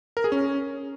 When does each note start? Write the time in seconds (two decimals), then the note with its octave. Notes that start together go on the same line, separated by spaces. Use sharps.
0.17 A#4
0.24 G#4
0.32 C#4